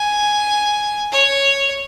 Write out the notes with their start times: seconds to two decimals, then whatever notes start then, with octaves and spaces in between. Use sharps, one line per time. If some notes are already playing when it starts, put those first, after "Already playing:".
Already playing: G#5
1.12 C#5